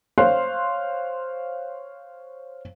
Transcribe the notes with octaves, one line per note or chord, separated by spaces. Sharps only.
C5 C#5 F5 C6 F#6